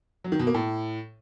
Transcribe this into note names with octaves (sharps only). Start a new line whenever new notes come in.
F#3
D#3
B2
A#3
A2